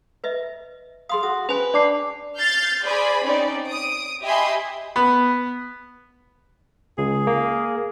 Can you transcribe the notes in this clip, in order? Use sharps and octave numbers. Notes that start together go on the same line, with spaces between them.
B4 D#5 E5
G#4 F5 C6 D#6
F#4 D#6
C#4 B4 C5 G#5 F7
D4 D5 A5 D6 C7
F6 G6 A6 C7
G#4 C5 D5 G#5 B5
C4 C#4 D#4 D5
D#6 D7
G4 D#5 E5 G#5 B5 C6
B3
C#2 G#4
A#3